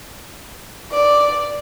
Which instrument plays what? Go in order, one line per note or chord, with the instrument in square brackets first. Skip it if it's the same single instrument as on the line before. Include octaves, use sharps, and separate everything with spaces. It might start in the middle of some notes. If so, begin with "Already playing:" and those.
[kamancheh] D5